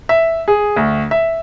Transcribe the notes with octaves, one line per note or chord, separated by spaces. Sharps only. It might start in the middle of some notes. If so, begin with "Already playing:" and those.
E5
G#4
D2
E5